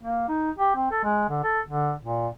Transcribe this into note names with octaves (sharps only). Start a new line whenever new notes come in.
A#3
D#4
G4
C4
A4
G#3
D3
A4
D3
A#2